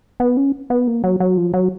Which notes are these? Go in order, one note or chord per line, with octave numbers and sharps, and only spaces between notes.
B3
C#4
B3
A#3
F#3
F#3
F3
F#3